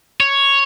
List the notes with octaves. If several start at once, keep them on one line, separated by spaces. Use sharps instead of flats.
C#5